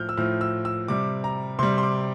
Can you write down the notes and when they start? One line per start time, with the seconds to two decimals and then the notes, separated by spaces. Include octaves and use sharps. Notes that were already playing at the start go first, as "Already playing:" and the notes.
Already playing: A2 F3 F6 G6
0.09 E6
0.17 A2 F3 F6
0.41 E6
0.65 E6
0.88 C3 G3 D6
1.24 A#5
1.59 C3 G3 C6
1.78 C6
1.83 D6